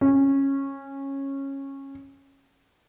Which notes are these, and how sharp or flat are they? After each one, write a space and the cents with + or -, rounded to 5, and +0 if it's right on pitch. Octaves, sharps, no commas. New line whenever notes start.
C#4 -15